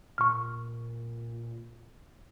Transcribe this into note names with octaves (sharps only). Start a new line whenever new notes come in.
A#2 C#6 F6